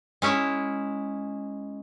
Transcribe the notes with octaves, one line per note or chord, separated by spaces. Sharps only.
G#3 C#4 E4